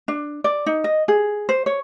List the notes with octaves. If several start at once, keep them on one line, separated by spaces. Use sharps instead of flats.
D4
D5
D#4
D#5
G#4
C5
C#5